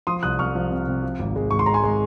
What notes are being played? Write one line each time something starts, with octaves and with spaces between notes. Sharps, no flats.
F3 C6 D#6
C2 D#6 F#6
C2 C#6 F6
F3
C3
C3
F3
G#1
G#3
G#1 C#6
C6
G#3 A#5
G#5 C6
G#3